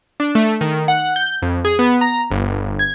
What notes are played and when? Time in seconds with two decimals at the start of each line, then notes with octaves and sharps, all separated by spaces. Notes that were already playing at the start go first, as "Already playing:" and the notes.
0.20 D4
0.35 A3
0.61 D#3
0.88 F#5
1.16 G6
1.42 F2
1.65 G#4
1.79 B3
2.01 A#5
2.31 G1
2.79 G#6